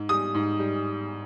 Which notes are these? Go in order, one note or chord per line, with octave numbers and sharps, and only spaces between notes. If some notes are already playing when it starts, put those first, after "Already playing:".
Already playing: G#2
G3 D#6
G#2
G3